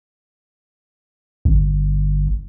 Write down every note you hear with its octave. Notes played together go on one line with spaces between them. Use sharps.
G1